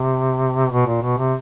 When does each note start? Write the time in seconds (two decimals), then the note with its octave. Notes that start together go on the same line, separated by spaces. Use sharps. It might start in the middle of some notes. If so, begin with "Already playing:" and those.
Already playing: C3
0.71 B2
0.87 A#2
1.02 B2
1.18 C3